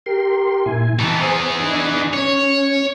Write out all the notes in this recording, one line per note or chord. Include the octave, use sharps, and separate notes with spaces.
G4 A#4 C6
A#2 E4 G#5
E3 D#4 A5
E3 G#4 C5
D4 D#4
C#4 C#5